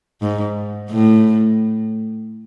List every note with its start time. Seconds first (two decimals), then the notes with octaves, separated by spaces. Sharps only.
0.22 G#2
0.91 A2